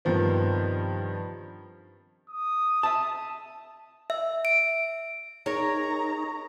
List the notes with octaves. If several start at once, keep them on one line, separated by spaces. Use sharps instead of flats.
G2 C3 D#3 F3 B3
D#6
E5 A5
E5
D7
D#4 G#4 A#4 C#5 A#5